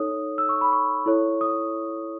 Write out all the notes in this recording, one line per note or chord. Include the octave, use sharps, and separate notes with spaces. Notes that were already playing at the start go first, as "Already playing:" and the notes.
Already playing: D#4 A4 C#5 D#6
E6
C#6
B5
C#6
E4 A4 C#5
D#6